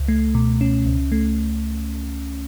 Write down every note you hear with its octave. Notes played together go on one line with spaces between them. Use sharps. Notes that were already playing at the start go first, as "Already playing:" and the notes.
Already playing: C#2
A3
B2
C#4
C#2
A3